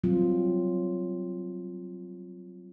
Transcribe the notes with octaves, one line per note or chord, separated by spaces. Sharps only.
F#3 G3 C4 F4